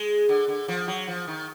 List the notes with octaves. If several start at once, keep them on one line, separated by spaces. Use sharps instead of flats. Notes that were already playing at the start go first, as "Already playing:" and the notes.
Already playing: G#3
D3
D3
F3
F#3
F3
D#3